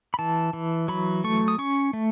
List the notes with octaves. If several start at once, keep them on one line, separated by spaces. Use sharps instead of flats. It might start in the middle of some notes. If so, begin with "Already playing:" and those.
B5
E3 A5
E3
F#3 B5
A3 C#6
D#6
C#4 C#6
A3